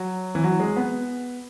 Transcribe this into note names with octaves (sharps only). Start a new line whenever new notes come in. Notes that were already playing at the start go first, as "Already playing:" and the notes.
Already playing: F#3
E3
F#3
G#3
B3